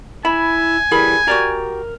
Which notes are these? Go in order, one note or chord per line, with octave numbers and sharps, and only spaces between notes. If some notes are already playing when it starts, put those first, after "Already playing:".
E4 G#5 B5
E3 G3 G#4 A#4 B5
F#4 G4 A#4 D5